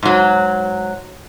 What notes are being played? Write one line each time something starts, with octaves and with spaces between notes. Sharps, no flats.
G#2 F#3